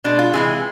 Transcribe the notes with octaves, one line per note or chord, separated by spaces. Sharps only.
B2 G#3 D4
F4
C3 E3 G#3 G#4